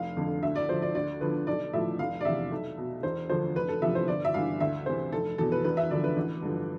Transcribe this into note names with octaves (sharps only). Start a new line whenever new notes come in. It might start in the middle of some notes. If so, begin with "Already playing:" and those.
Already playing: F1 F5
F2 D3
D2 E5
D5
D3 F3 C5
D5
D2 D5
D3 F3 B4
B1 D5
A2 F3 E5
F1 F5
D5
E2 C3 E5
B1
B2
E1 C5
D2 D3 F3 C5
F1 B4
A4
E2 C3 F3 E5
C5
G1 D5
E5
G2 E3 F5
D2 E5
C3 E3 C5
F1 A4
E2 B2 A4
B4
E1 B4
E5
D2 D3 F3 D5
B4
A1
G2 D3 F3